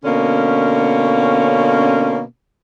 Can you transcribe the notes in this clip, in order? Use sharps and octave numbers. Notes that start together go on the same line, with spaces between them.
B2 D3 A#3 C#4